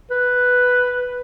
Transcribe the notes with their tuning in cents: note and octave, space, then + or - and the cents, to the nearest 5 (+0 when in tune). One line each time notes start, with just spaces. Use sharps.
B4 +0